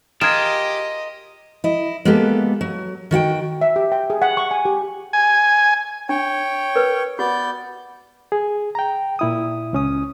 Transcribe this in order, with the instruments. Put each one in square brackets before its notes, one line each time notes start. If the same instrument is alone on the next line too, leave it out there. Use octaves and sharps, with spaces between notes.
[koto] F4 G#4 A#4 [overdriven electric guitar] G4 [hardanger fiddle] D#5 [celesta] G#6 E7
[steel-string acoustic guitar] E4 D#5
G#3 A#3 B3 G4 A4
F#3
D#3 F#4 F#5 G5
[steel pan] E5
G4
G5
G#4
F#5
C#6
G#5
G4
[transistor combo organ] G#5
[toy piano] D4 [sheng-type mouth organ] C#5 G5
[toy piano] A#4 B4
[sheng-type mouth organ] B3 D5 G6 [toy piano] F#4
[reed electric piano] G#4
G5 A#5
A#2 E4 D#6
C#2 C#4 D#6